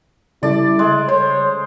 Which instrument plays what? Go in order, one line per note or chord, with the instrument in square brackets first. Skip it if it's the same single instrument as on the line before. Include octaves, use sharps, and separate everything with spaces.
[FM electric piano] C#3 G3 A4 [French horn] E4 [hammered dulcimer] D5
[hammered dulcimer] G#3
[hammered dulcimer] C5 [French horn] C#5